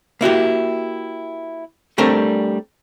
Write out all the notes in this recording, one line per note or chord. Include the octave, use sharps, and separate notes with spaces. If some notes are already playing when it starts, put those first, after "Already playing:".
A#3 E4 F#4 G4
G3 A3 C4 D4 A#4 C#5